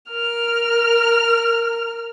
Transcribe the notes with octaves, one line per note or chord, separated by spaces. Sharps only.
A#4 F6